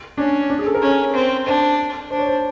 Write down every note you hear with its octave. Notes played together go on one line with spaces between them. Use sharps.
C#4 D4
D4
G#4
A4
A#4
C#4
C4
D4 C5
D4 C5
C#5
C5